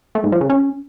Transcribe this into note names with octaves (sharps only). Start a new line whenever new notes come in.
A3
G#2
F3
C#3
C#4